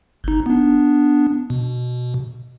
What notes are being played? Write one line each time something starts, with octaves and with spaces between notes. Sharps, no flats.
G1 D#4
B3 D4
B2